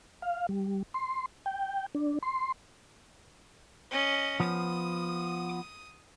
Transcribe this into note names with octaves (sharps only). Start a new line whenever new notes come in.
F5
G3
C6
G5
D4
C6
C#4 D#5
F3 B3 D#6